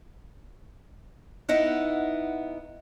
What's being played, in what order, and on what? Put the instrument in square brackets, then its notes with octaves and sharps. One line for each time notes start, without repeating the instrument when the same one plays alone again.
[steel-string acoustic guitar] B3 D#4 E4 F#5